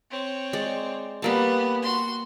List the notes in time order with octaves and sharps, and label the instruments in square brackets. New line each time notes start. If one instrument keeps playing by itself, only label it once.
[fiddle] C4 C#5
[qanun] G#3 D5
[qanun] G3 A#3 A5 [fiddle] B3
[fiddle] F#4 C6